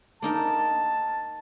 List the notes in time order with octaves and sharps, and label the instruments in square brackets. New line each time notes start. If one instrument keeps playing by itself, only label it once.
[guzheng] A#3 D#4 A#4 [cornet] A5